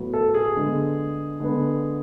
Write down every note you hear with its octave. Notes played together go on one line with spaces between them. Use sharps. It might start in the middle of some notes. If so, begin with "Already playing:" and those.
Already playing: A2 F#3 B3
A4
G#4
D3 G#3 B3
D3 G#3 B3